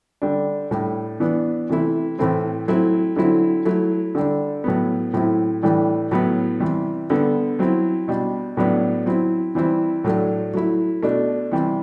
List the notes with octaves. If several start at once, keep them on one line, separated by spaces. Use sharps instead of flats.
D3 G3 D4
A2 G3 D4
E3 B3 D4
C3 E3 A3 E4
A2 E3 A3 C4 E4
F#3 A3 C4 E4
D3 F#3 C4 E4
F#3 A3 E4
D3 G3 D4
A2 F#3 B3
A2 F#3 C4 E4
A2 E3 G3 D4
A2 F#3 B3 E4
C3 E3 G3
D3 G3 B3
F#3 C4 E4
B2 G3 D4
A2 F#3 B3 D4
F#3 C4 E4
E3 G3 C4 E4
A2 F#3 A3 D4
F#3 A3 E4
B2 A3 D4
C3 E3 G3